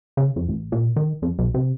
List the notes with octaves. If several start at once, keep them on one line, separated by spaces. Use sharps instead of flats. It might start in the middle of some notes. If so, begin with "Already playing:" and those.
C#3
F2
A1
A#2
D#3
F2
B1
C3